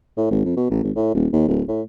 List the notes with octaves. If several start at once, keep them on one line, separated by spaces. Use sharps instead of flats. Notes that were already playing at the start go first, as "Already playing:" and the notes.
A2
G#1
F2
B2
A1
G#1
A2
D#1
D#2
D1
A2